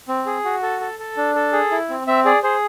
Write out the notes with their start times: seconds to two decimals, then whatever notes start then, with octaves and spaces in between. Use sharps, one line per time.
0.08 C4
0.26 G#4
0.45 F#4
0.63 A4
0.81 A4
0.99 A4
1.17 D4
1.35 A4
1.53 G#4
1.71 E4
1.89 C4
2.07 C4 E5
2.25 G#4 D5
2.43 G#4 C5